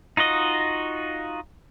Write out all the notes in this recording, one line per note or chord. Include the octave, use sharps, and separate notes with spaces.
D#4 F4 F#4 D#5